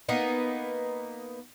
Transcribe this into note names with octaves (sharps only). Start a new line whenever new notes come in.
A#3 B3 D#4